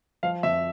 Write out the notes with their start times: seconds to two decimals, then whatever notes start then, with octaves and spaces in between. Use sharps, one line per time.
0.23 F3 F5
0.43 F2 E5